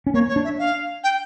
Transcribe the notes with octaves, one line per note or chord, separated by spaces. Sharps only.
C#4
A#3 C#5
C#5
D4
E5
F5
G5